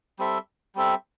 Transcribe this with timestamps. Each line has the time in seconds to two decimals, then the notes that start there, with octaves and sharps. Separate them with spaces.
0.19 G3 C4 A4 E5
0.75 G3 C4 A4 E5